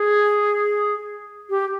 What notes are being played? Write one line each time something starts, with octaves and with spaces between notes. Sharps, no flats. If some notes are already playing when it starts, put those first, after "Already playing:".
Already playing: G#4
G4